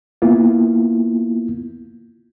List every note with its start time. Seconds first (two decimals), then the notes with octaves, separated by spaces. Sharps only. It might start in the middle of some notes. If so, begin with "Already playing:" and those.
0.22 A#3 B3 E4 F4